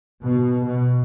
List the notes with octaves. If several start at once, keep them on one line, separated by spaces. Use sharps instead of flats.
B2
B2